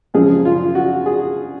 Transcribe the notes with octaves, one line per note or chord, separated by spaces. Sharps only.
F#2 C#3 F3 G#3 C4 G#4
F4
F#4
G#4